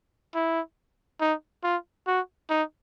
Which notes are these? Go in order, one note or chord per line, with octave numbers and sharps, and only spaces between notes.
E4
D#4
F4
F#4
D#4